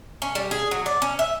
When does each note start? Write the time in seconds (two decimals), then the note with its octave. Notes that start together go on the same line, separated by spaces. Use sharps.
0.22 C#4
0.35 G3
0.51 G#4
0.71 F#3
0.86 D5
1.02 C#4
1.19 E5